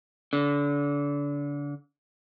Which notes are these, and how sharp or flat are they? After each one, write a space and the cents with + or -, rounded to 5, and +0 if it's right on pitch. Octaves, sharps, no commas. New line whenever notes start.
D3 -30